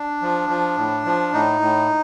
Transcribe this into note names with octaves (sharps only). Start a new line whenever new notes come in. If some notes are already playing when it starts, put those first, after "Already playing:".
Already playing: D4
F3
F3
A2
F3
A2 D#4
A2